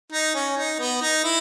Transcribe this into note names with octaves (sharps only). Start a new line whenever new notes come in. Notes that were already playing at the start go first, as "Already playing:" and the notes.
D#4
C#4
D#4
B3
D#4
E4